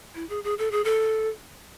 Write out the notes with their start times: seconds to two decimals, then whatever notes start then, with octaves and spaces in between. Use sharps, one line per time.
0.15 E4
0.29 G#4
0.44 G#4
0.58 A4
0.71 G#4
0.84 A4